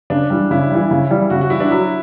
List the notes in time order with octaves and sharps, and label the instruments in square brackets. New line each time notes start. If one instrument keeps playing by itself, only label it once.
[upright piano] C#3 [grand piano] D4
[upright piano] E3 G3
[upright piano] C#3 [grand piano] E4
[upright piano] E3 G3
C#3
E3 G3
[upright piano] C#3 [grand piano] F#4
[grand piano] F#4
[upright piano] E3 G3 [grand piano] E4
[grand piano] D4
[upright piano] F#3 [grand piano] E4